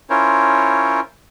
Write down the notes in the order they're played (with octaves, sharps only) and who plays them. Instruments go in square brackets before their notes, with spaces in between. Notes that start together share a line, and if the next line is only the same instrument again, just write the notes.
[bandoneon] C#4 E4 F4 A#4 C5 C#5